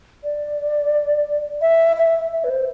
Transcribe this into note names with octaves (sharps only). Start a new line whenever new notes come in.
D5
E5
E5
E5
B4
C5